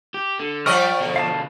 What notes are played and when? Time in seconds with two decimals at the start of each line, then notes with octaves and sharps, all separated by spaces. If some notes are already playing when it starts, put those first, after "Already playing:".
0.14 G4
0.39 D3
0.66 F3 G3 D5 D#5 G5 C#6 F6
1.00 B2 D3
1.16 F5 A5